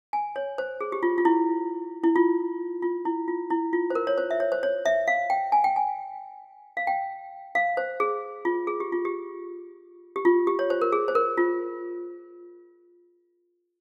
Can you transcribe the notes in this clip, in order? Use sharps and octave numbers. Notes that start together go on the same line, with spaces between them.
G#5
C#5
C5
G#4
G4
F4
F4
E4
E4
F4
F4
E4
F4
E4
F4
C5
A#4
C#5
C5
E5
C#5
C5
C#5
E5
F5
G5
G#5
G5
G#5
F5
G5
F5
C5
G#4
F4
G#4
G4
F4
G4
G4
F4
G4
C#5
C5
A#4
G#4
C5
A#4
F4